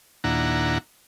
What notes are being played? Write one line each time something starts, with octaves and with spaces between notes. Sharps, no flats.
D#2 A#2 D4 E4 F#5 A#5